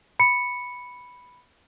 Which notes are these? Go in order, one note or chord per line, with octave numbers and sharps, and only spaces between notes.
B5 C#7